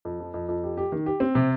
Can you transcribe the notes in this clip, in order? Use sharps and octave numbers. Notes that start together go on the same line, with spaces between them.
F2
F3
F2
F2
G4
G4
D#3
G4
C4
C3